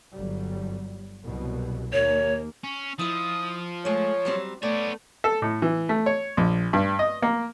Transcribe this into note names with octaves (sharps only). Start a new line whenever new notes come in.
G1 F#3 G3
C2 B2 F#3
D#2 A#3 C#5
C#4
F3 E4 D#5 D#6
G#3 A3 C#5
F#3 G3 C4
A3 B3 C#5 D5
A4
A2
E3
A3
C#5
A#1
G2
D#5
A#3